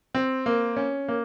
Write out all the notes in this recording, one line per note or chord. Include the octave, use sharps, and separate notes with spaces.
C4
A#3
C#4
A#3